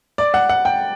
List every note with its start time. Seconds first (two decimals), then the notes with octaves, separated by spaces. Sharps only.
0.18 D5
0.34 F#5
0.49 F#5
0.65 G5